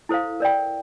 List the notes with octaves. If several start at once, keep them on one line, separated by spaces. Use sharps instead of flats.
E4 A4 C5 F5
A#4 D5 G5